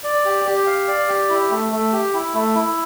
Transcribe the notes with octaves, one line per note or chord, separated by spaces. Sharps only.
D5
G4
G4
F5
D5
G4
E4
A3
A3
G4
E4
A3
E4